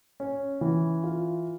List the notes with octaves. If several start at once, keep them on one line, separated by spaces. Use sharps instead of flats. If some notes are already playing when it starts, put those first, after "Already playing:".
C#4
E3
F4